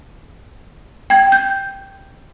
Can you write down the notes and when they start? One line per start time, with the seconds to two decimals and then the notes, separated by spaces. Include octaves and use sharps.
1.10 G5 G#6
1.32 G6